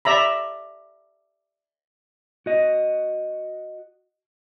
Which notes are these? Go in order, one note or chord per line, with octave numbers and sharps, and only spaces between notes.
D5 E5 A#5 B5
F#4 D#5